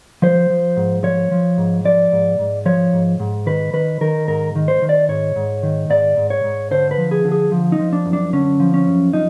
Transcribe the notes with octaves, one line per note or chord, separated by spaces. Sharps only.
F3 C5
F3
G#2
F3 C#5
F3
G#2
F3 D5
G#2
G#2
F3 C#5
G#2
G#2
D#3 B4
D#3 B4
D#3 A#4
G#2 A#4
D#3
C5
D#3
D5
G#2 C#5
G#2
D#3
G#2 D5
G#2
C#5
G#2
D3 C5
B4
F3
G#4
D3
G#4
F3
D#4
F3
D4
F#2
D4
D3 C#4
F3
C#4
F#2
F3 D#4